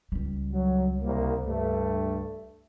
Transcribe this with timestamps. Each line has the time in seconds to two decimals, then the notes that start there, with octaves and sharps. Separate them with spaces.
0.12 C#2 G3
0.52 F#3
1.02 C2 A#3
1.45 G2 A3